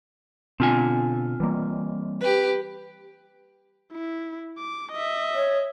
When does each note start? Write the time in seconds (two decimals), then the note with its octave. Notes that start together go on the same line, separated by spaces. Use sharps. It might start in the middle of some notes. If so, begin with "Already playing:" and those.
0.60 B2 D3 C4 F4 G#5
1.40 E3 G3 A#3
2.20 G4 B4
3.92 E4
4.58 D6
4.92 D#5 E5
5.35 C#5